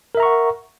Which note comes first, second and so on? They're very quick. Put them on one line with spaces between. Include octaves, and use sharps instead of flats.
A#4 E5 A#5 C#6 F#5